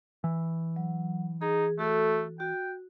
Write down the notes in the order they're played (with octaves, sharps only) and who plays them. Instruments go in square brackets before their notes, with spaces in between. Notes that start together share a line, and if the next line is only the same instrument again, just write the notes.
[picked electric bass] E3
[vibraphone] F#3
[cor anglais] D#4 [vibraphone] G#4
[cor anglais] A3 [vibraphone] F#4 A4
[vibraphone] F#4 [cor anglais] G5